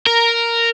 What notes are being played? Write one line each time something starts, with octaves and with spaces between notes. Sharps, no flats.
A#4